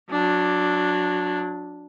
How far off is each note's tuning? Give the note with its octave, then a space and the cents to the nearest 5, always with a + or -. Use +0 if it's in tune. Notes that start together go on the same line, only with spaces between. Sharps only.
F#3 -25 D4 +0